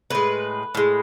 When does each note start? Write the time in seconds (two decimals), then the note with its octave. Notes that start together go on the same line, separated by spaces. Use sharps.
0.10 A2 G#3 B4
0.75 A2 G#3